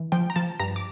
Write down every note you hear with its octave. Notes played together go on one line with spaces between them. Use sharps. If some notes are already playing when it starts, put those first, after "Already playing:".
Already playing: E3
F3 G5
A#5
F3 A5
G2 A#5
D6